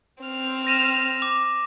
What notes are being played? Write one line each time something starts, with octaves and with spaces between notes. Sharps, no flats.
C4 F6
A#6 D#7 E7
D6